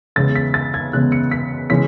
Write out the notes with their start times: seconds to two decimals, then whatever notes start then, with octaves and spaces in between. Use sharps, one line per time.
0.16 E2 C#3 G#3 B3 A6
0.36 B6
0.54 A6
0.74 G#6
0.93 E2 C#3 G#3 B3 F#6
1.12 C#7
1.31 B6
1.70 C#3 E3 G#3 C#4 B6